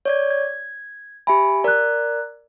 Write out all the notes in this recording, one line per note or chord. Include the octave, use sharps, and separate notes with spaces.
C#5 D5 G#6
G#6
G4 E5 G#5 B5
A#4 D5 A#5 F#6